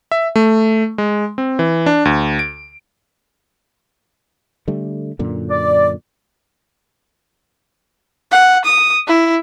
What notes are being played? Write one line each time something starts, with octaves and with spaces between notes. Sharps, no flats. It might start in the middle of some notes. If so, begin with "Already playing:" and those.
E5
A3
G#3
C4
E3
D4
D2
D7
D3 G3 A3
F#2 A#2 D3
D5
F#5
D#6
E4